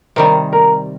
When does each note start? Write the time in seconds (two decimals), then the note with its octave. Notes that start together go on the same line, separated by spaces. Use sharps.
0.16 C3 D#3 G3 A#4
0.53 A#4